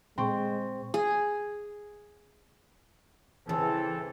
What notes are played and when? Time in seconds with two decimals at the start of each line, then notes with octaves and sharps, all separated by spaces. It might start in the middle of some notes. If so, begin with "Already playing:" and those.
0.18 A#2 G#3 C4 G5 C6 C#6
0.94 G#4
3.49 C#3 E3 C4 A4